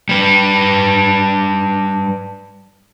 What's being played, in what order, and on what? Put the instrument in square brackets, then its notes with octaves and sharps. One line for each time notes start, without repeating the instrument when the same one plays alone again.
[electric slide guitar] G3 B4